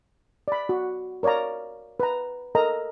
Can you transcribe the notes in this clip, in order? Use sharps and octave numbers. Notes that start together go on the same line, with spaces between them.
D5 B5
F#4
A#4 C#5 D5 F5 A#5
B4 A#5
A4 A#4 D#5 A#5